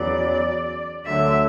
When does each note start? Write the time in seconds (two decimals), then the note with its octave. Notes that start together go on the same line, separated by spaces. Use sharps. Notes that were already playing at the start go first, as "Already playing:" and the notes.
Already playing: E2 C#3 F#3 D5
1.05 D2 D3 F#3 E5